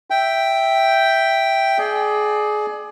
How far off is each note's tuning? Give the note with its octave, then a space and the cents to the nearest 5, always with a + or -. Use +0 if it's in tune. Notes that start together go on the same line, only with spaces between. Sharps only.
E5 +0 G5 +0
G#4 +25 D5 +25